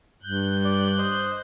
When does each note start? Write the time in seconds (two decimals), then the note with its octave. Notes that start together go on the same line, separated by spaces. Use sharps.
0.23 G2 F#6 G6
0.65 D5
0.98 C5 D#5